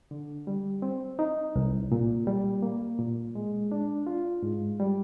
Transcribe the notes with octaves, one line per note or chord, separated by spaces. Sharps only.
D3
G3
C4
D#4
C2
A#2
G3
A#3
A#2
G#3
D4
F4
G#2
G3